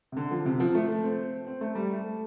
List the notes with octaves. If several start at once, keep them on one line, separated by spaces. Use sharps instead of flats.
C3
D3
F3
C3
F3
A3
C4
C4
A3
G3
A3